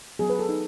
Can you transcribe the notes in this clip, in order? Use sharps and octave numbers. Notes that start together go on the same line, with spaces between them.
F#3 B3 G#4
B4
A4
D#4